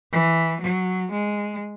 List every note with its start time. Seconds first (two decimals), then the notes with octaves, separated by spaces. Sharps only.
0.12 E3
0.62 F#3
1.12 G#3